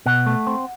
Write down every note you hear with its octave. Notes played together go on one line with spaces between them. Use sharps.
B2 F#5
A3
C4